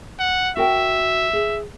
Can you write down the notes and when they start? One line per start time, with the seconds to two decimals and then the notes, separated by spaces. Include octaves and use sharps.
0.20 F#5
0.57 F#4 A#4 E5 G5
1.33 G#4